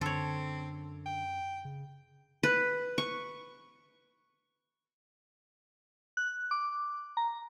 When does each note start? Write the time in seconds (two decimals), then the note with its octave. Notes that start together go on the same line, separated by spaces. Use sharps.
0.01 F#2 D3 C4 A4 C#5
1.06 G5
1.65 C#3
2.43 B4
2.98 C#6
6.17 F#6
6.51 D6
7.17 A#5